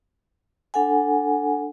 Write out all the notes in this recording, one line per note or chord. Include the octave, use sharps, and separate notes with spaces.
D4 A4 F#5 G#5